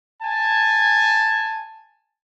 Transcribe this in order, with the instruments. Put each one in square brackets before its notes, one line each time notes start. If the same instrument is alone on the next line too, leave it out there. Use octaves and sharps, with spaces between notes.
[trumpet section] G#5 A5